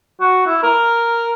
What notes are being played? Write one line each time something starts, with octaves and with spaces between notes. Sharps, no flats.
F#4
E4
A#4